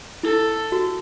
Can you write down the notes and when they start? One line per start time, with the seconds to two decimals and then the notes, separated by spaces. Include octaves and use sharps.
0.23 E4 A4
0.72 F#4